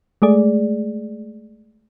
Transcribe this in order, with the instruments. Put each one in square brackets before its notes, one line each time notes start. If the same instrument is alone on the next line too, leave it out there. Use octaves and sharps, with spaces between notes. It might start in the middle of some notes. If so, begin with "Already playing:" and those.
[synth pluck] G#3 A3 G#4 D5